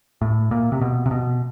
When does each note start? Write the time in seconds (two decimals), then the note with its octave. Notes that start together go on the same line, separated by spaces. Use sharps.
0.22 A2
0.51 A#2
0.72 C3
0.81 B2
1.06 C3
1.11 B2